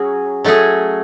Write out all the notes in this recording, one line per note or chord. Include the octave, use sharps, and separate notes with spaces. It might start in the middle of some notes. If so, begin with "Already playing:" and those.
Already playing: F#3 C#4 G#4
F#3 A3 C#4 G#4